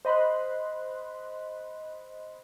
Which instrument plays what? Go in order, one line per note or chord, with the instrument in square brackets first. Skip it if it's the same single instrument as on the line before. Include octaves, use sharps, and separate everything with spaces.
[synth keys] C5 D#5 B5 C6 F#6